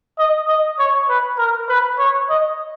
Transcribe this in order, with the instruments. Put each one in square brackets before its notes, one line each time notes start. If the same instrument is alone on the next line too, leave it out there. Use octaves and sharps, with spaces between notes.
[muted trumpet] D#5
D#5
C#5
B4
A#4
B4
C#5
D#5